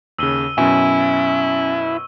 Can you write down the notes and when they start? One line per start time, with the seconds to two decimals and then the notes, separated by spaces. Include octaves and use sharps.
0.19 D#2 C#3 E6 D#7 G7
0.58 F#2 B2 C#4 E4 G#5 C#6